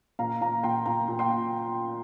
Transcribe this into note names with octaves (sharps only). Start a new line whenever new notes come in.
A#2 F5 A#5
A#2 F5 A#5
A#2 G5 C6
A#2 F5 A#5
A#2
G5 C6
F4